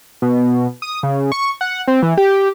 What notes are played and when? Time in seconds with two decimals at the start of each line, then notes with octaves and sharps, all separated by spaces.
0.22 B2
0.82 D#6
1.03 C#3
1.32 C#6
1.61 F#5
1.88 C4
2.03 E3
2.17 G4